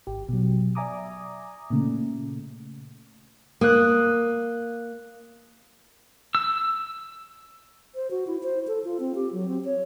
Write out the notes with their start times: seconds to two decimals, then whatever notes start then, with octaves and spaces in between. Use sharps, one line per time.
0.07 G#1 G4
0.29 B2 F#3
0.75 D5 E5 G#5 A#5 D6 D#6
1.70 A#2 C#3 A3
3.61 A#3 D#6 F#6
6.35 E6
7.95 C5
8.11 F#4
8.27 E4
8.43 C5
8.67 A4
8.84 F4
9.00 C4
9.15 G4
9.33 F#3
9.48 C4
9.65 C#5